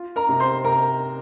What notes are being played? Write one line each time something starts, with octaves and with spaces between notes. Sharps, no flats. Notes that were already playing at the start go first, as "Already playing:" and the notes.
Already playing: F4
A#4 A#5
C3
C5 C6
C3 A#4 A#5